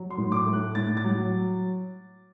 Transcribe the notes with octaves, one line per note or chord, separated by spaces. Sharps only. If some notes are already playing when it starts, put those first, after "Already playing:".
Already playing: F#3
C6
A2
D6
A3
F#6
A2 A6
A6
F#3